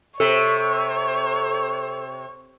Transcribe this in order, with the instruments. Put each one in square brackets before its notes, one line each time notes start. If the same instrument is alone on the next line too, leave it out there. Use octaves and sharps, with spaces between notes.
[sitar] C3 [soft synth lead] A4 [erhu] C#5